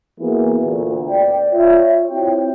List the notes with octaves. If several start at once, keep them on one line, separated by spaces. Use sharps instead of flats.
E3 A#3 B3 E4 F#4 G#4
D2 A#2
D5 G5
F4 C#5 E5
C4 E4 F#4 C#5 G5